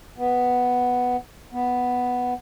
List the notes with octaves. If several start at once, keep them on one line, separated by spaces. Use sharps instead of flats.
B3
B3